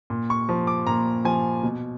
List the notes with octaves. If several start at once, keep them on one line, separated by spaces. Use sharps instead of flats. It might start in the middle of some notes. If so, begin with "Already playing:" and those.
A#2
C#6
F3
D6
A#2 A#5
F3 G#5
B2